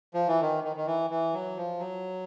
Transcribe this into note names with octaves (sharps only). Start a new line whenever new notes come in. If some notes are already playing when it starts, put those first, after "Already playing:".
F3
E3
D#3
D#3
D#3
E3
E3
F#3
F3
F#3